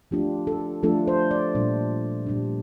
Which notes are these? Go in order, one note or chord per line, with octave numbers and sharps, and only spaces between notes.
F3 A3 D4 F4 G4
A4
F3 A3 D4 F4 A4
C5
D5
A#2 G3 D4
A#2 G3 D4